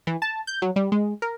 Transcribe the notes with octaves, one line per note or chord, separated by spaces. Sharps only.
E3
A5
G6
F#3
G3
G#3
A#4